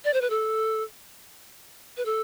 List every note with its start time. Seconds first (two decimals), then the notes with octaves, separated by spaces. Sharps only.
0.04 D5
0.14 C5
0.21 B4
0.30 A4
1.97 B4
2.05 A4